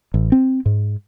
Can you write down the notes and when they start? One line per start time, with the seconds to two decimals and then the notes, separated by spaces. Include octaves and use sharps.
0.14 A1
0.32 C4
0.66 G#2